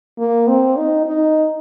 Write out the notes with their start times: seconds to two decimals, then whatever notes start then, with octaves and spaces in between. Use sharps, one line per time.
0.18 A#3
0.48 C4
0.77 D#4
1.06 D#4